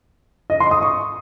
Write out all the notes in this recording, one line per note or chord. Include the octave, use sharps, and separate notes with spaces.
D#5
C6
D#6
C#6